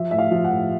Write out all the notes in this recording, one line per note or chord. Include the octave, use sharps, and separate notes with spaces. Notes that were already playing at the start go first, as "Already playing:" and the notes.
Already playing: F3 E5
A2 E5
F5
F3
F#5
A2